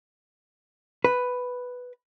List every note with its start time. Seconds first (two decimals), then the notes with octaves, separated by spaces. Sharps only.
1.04 B4